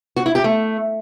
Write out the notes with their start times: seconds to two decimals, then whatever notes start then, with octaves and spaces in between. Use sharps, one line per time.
0.16 F#4
0.26 E4
0.35 G4
0.44 A3